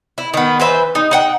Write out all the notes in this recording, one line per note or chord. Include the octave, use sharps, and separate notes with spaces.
E4
D#3 B3
E3 B4 C5 E5
D#4
D#4 F#5 G5